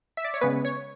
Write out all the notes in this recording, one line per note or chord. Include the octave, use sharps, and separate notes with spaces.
E5
D5
C#5
C#3 G#3 B3 B4
C#5